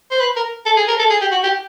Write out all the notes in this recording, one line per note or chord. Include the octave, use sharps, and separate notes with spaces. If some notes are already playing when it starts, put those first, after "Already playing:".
C5
B4
A#4
A4
G#4
A#4
A4
G#4
G4
F#4
G4